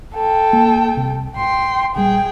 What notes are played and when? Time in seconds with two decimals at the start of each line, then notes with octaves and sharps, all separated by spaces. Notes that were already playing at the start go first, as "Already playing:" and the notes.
0.14 A4 G5
0.53 A#3
0.97 C2 C3
1.36 G#1 G5 C6
1.96 A#1 G3 G#4 G5